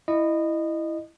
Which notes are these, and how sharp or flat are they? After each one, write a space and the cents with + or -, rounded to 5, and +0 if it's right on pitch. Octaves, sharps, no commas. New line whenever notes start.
E4 +0 D#5 -20